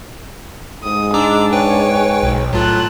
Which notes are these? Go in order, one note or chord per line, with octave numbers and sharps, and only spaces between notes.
G#2 D#6
G#3 D4 A#5 D6 E6
B4 C#5 G5 G#5
B1
A2 F#3 F4 A5 F#6